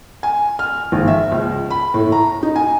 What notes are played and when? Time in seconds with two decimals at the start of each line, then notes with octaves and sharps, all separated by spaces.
0.23 G#5
0.59 F6
0.92 G#1
1.08 E5
1.32 C#2
1.71 B5
1.94 A2
2.12 A#5
2.43 D#4
2.56 G#5